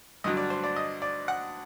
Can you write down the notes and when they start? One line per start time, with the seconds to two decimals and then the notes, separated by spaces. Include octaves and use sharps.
0.24 G2 D3 F#3 D#5
0.37 D5
0.50 C5
0.64 D5
0.76 D#5
1.02 D5
1.28 F#5